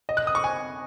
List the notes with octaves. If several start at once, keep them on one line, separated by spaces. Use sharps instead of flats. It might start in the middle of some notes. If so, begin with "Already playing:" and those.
D#5
F#6
D#6
C#6
G#5